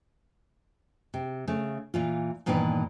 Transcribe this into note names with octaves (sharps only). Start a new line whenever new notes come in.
C3
C#3 A3
A#2 E3 F4
G2 A#2 D#3 E3 B3 B4